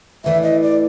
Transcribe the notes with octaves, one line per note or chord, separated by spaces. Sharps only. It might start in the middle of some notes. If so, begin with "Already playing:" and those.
A2 E3 A3 D4 E5
D#5
D5